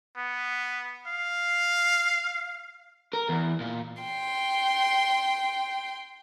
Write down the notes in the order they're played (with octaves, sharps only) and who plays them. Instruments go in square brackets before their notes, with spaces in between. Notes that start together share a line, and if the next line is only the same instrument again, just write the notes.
[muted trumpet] B3
F5
[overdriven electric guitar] A#4
E2
A#2
[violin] G5 C6